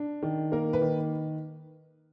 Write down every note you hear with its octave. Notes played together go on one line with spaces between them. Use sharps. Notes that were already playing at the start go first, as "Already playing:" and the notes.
Already playing: D4
D#3
A#3 A#4
B4
D#3